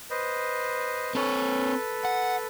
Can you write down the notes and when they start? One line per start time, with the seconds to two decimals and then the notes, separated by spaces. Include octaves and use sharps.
0.11 B4 C5 D#5
1.15 C4 A4 B4 C#5
2.05 F#5